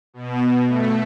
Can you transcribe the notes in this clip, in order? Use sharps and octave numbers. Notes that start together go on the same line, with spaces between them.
B2
A3